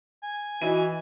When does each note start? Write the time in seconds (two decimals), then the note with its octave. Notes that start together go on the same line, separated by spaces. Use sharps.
0.23 G#5
0.62 E3 E4 F#4 D#5 D#7